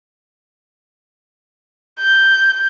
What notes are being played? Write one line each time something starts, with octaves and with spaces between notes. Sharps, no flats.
G6